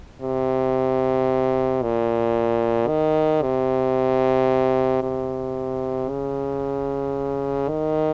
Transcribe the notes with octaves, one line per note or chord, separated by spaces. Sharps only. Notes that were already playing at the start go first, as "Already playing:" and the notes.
C3
A#2
D#3
C3
C3
C#3
D#3